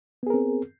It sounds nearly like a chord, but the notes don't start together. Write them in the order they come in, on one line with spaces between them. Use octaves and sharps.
B3 G#4 A#4 C4